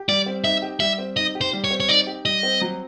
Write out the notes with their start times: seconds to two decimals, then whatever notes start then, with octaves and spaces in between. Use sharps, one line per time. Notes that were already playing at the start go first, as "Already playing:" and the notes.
Already playing: G4
0.09 G3 D5
0.26 C4
0.44 D#4 E5
0.62 G4
0.80 G3 E5
0.98 C4
1.16 D#4 D#5
1.35 G4
1.41 C5
1.53 G3
1.64 C#5
1.71 C4
1.80 C#5
1.89 D#4 D5
2.07 G4
2.25 G3 D#5
2.43 C4
2.61 F#3